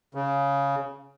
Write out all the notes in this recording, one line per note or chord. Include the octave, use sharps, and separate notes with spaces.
C#3